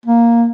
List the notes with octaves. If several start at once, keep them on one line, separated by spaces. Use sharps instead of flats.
A#3